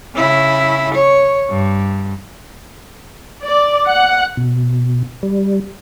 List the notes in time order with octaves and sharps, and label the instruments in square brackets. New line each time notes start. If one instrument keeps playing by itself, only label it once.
[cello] C#3 E4
C#5
G2
[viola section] D5
F#5
[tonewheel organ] B2
G3